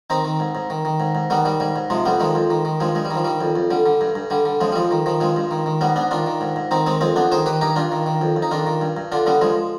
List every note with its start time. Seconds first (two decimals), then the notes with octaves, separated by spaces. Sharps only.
0.10 D#3 C4 D#4
0.25 D#3
0.40 G#2
0.55 G#2
0.70 D#3
0.85 D#3
1.00 G#2
1.15 G#2
1.30 D#3 G3 B3
1.45 D#3 G3
1.60 G#2 G3
1.76 G#2
1.90 C3 F3 G#3
2.05 F2 G3 B3
2.20 D#3 F3 G#3
2.35 F2
2.50 D#3
2.65 D#3
2.80 G2 F3 G#3
2.95 G2 G#3
3.05 G3
3.10 D#3
3.16 F3
3.24 D#3 G3
3.41 F2
3.56 F2
3.71 D3 G3
3.86 D3
4.01 G2
4.15 G2
4.30 D3 G3
4.45 D3
4.61 F2 F3 G#3
4.72 G3
4.75 F2 F3 G#3
4.91 D#3
5.06 D#3 F3
5.20 G2 F3 G#3
5.36 G2
5.51 D#3
5.66 D#3
5.81 G#2 G3 B3
5.96 G#2 B3 D4
6.11 D#3 D4 F4
6.26 D#3
6.41 G#2
6.56 G#2
6.71 D#3 C4 D#4
6.86 D#3 G#3 C4
7.01 F2 G#3 C4
7.16 F2 B3 D4
7.32 D#3 G#4 C5
7.46 D#3 G4 B4
7.61 G2 D#4 G4
7.76 G2 D4 F4
7.92 D#3
8.06 D#3
8.21 F2
8.36 F2
8.42 D#4
8.51 D#3 D4 F4
8.66 D#3
8.81 G2
8.97 G2
9.12 D3 D4 F4
9.26 D3 G3 B3
9.41 G2 F3 G#3